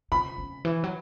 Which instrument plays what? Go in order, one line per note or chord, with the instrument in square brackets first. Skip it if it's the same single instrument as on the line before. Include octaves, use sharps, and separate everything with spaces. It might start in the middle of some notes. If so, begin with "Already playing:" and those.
[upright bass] C#3 [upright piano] B5
[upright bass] C#3
E3
F#3